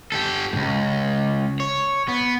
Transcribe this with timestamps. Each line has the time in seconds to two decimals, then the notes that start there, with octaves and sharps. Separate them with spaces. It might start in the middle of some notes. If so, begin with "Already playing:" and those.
0.12 G4 A4
0.53 C#2 G2
1.60 C#5
2.08 B3